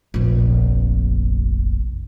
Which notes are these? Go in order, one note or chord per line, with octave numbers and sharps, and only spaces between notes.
F1 A#1